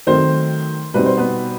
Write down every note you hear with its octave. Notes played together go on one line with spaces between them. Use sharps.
D#3 F#3 A3 C4 C5
B2 G3 C4 D#4 B4
C5
B3 B4